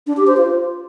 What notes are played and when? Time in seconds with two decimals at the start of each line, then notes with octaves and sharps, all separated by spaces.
0.07 D4
0.17 G4
0.27 C5
0.37 F4